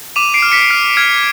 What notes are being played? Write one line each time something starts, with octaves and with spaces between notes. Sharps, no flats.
D6 D#7 F7
C7 D7
F6
B6 C#7
F6 C7
F6 G#6